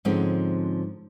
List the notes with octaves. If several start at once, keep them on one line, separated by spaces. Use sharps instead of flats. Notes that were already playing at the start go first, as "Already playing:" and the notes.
G#2 D3 F3 G#3 C4 C#4